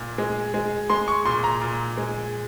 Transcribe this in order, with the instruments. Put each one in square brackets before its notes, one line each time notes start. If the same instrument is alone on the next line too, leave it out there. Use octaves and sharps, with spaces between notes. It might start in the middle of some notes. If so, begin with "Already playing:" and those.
Already playing: [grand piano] A#2
G#3
G#3
G#3 C6
C#6
A#2 C6
A#5
A#2
G#3